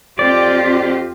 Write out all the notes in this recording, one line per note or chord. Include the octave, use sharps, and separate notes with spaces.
F2 C4 F4 G4 D5